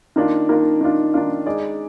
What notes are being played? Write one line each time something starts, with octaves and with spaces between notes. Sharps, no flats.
D#3 A#3 D4 F4
D#3 A#3 D4 F4
D#3 A#3 D4 F4
D#3 A#3 D4 F4
G#3 D#4 G#4 D5